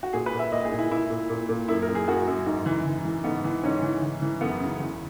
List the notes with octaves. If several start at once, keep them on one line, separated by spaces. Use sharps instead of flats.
F#4
A#2 G#4
B4
A#2
E5
A#2 D#5
G#4
A#2
E4
A#2 E4
A#2
A#2
A#2
F#2 E4
A#4
F#2
G#4
F#2 F#4
F#2
G#2
E3
E3
E3
G#2 B3
E3
G#2 C#4
E3
E3
E3
F#2 B3
C#3
E2